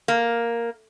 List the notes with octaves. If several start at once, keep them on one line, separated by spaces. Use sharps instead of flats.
A#3